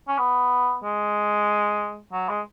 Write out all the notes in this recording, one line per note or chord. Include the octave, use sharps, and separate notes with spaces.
C#4
B3
G#3
F#3
G#3